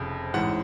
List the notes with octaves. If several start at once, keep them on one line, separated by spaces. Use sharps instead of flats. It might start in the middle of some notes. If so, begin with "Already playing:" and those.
Already playing: F1 F2 C#3
A1 G#2 E3 F#5